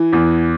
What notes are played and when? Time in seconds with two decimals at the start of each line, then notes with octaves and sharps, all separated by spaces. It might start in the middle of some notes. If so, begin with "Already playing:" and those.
Already playing: E3
0.13 E2